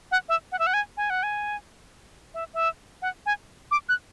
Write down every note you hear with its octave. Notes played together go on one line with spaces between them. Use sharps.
F#5
E5
F#5
E5
F#5
G#5
G#5
F#5
G#5
E5
E5
F#5
G#5
D6
F#6